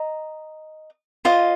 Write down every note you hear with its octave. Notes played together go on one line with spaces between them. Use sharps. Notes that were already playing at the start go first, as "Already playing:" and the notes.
Already playing: D#5 A#5
F4 C5 D#5